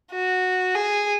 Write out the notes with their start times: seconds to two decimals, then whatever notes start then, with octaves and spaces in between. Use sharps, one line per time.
0.12 F#4
0.76 G#4